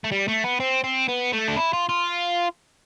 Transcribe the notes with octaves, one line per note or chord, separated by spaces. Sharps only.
A3
G3
A3
B3
C4
C4
B3
A3
D4
E4
F4
F4